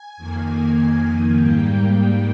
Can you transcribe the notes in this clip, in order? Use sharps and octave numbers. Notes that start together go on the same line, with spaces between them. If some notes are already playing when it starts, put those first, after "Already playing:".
Already playing: G#5
F2 D#3 A#3
G#2 G3 A#3 G5
G5